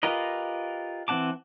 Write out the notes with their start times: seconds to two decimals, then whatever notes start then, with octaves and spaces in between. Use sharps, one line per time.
0.03 F4 G4 A#4 B4 D#5
1.08 E3 C4 F#5 A5 D6